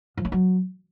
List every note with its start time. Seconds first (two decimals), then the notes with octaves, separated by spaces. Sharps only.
0.17 F3
0.25 C#4
0.32 F#3